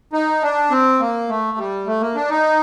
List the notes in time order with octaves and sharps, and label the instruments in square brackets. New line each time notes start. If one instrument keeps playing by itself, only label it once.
[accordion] D#4
D4
C4
A#3
A3
G3
A3
A#3
D4
D#4